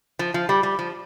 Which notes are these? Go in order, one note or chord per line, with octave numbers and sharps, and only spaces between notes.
F3
F3
G3
G3
F3